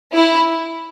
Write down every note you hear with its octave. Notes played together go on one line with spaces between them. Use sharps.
E4